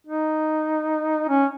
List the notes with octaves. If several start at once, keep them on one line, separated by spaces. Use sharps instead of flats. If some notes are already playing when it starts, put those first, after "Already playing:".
D#4
C#4